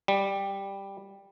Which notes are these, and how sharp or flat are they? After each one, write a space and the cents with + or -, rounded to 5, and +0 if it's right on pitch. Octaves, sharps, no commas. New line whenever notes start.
G3 +5